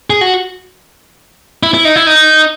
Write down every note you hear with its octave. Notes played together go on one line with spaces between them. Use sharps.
G#4
F#4
E4
E4
D#4
E4
D#4